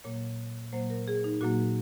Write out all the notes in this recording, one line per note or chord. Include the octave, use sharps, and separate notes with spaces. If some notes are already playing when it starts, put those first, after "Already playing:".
A#2 F#3 A#3 C#5
A#2 F#3 A#3 C5
A#4
G#4
D#4
A#2 F#3 A#3 F#4